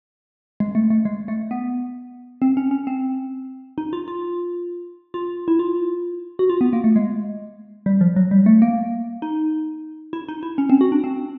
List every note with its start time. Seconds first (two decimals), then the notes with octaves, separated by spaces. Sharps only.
0.60 G#3
0.75 A3
0.90 A3
1.05 G#3
1.28 A3
1.51 B3
2.42 C4
2.57 C#4
2.71 C#4
2.87 C4
3.78 D#4
3.93 F4
4.08 F4
5.14 F4
5.48 E4
5.59 F4
6.39 F#4
6.50 F4
6.61 B3
6.73 A#3
6.84 A3
6.96 G#3
7.86 G3
8.01 F3
8.16 F#3
8.31 G3
8.46 A3
8.62 A#3
9.22 D#4
10.13 E4
10.29 D#4
10.43 E4
10.58 C#4
10.70 C4
10.81 F#4
10.92 D4
11.04 C4